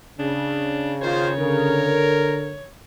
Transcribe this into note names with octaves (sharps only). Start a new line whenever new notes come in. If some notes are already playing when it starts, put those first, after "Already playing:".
C#3 D4
D#3 F4 C5 C#5
D3 A#4